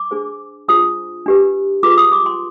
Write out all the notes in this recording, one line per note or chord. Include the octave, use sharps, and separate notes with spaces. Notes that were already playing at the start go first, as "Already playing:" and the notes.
Already playing: D6
D4 G#4 C5
D4 F4 G#4 C5 D#6
D4 G4 B4
F4 G#4 B4 D6
D#6
D6
C6